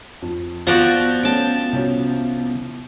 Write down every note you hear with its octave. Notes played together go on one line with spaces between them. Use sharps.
F2
F3 B3 F#4 D5 F#5
A3 C#4 G5 A5
C2 C#4 F#4